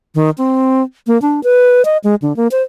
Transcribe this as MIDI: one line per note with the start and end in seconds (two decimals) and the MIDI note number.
0.15 0.30 51
0.38 0.83 60
1.07 1.20 58
1.22 1.40 62
1.43 1.84 71
1.85 1.97 75
2.04 2.15 56
2.22 2.35 50
2.36 2.48 58
2.51 2.62 72